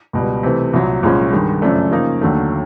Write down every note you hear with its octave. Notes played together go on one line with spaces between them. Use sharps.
C#2 B2 G3
C3 E3 A3
C2 A#2 F#3
C2 A#2 F3 G#3 C#4
G2 D#3 G#3
F#2 C#3 F3 A3 D4
C#3 F3 A#3 D#4
D#2 D3 F#3 A3